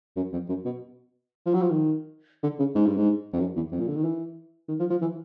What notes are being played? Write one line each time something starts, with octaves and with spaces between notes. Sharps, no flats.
F#2
F2
F#2
B2
F3
F#3
F3
D#3
D3
C#3
G#2
G2
G#2
F2
F#2
E2
F2
A#2
D3
D#3
E3
D#3
F3
F3
E3